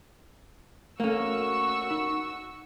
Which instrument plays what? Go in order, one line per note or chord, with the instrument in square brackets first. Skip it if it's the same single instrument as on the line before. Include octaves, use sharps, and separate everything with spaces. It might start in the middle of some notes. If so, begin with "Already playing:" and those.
[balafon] A3 A4 [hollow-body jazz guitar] A#3 C#4 [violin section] F#4 C#6 E6
[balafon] D#4